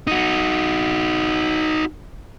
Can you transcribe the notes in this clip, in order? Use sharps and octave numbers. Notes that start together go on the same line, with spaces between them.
D#4 F#4